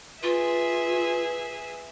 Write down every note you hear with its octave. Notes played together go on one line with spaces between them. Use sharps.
F4 G#4 B4 E5